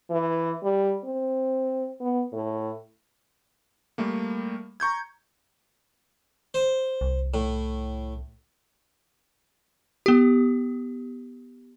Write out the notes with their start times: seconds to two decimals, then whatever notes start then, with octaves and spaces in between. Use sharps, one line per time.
0.10 E3
0.63 G3
1.04 C4
2.00 B3
2.33 A2
3.98 G3 A3 A#3
4.80 A#5 C#6 G6 G#6
6.54 C5
7.01 C2
7.34 A2
10.06 B3 G4